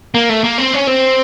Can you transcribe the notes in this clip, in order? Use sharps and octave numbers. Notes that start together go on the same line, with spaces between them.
A#3
A3
A#3
C4
C#4
C4